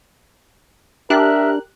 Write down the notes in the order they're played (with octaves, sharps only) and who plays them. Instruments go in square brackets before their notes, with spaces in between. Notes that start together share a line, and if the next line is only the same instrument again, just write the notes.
[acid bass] D4 [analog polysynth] G4 F#6 [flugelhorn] A#4 [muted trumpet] E5